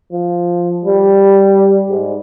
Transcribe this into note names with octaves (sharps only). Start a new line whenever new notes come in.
F3
G3
G#2